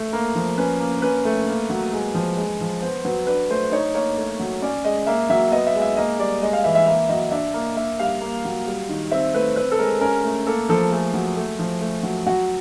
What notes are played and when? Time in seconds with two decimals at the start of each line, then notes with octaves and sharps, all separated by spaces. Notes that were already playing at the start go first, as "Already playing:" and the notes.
Already playing: A3
0.13 A#3 A#4
0.35 F3
0.58 C#4 B4
0.80 A#3
1.02 C#4 B4
1.25 A3
1.48 A#3
1.70 F#3
1.92 G#3
2.14 F3
2.37 G#3
2.61 F3
2.82 B3 C5
3.05 F#3 B4
3.27 D4 B4
3.50 A3 C5
3.72 D#4 C#5
3.94 A#3 C#5
4.18 A3
4.40 F#3
4.62 C#4 D5
4.85 G#3 D#5
5.07 A#3 E5
5.30 F#3 E5
5.52 B3 D#5
5.67 E5
5.75 G#3
5.82 E5
5.97 A#3 D#5
6.19 G3 D5
6.42 G#3 D#5
6.53 F5
6.64 E3 E5
6.75 E5
6.87 A#3 E5
7.09 F#3 D#5
7.31 D4 E5
7.54 A#3
7.76 A#3 E5
7.99 G3 F5
8.21 A#3
8.45 F#3
8.67 G3
8.89 D#3
9.11 C4 E5
9.34 A3 B4
9.56 C4 B4
9.72 A4
9.79 G#3 A#4
10.01 C#4 A#4
10.24 A3
10.47 A#3 A4
10.69 F3 A4
10.91 A3 G#4
11.14 F#3
11.37 A3
11.59 F3
11.81 A3
12.03 F#3
12.27 F#3 F#4